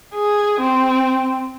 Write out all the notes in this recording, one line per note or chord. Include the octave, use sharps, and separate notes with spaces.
G#4
C4